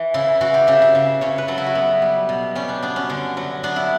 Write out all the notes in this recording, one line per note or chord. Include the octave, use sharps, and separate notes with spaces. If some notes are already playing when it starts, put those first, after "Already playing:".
Already playing: E3
C#3 E4
E3 F#4
G4
C#3 E5
E5
C#3
C#3 C#5
B4
F#3 A4
E4
F#4
B3
G3
B2
G3 C#4
D4
B3 D4
C#4
D3
F#3
B3 D4
E4